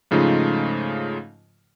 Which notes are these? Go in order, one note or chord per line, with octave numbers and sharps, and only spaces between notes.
G#2 C#3 F3 A3 D#4 F4